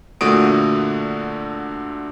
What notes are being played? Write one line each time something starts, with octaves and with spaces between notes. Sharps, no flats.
A#2 D3 A3 F#4 D#6 D7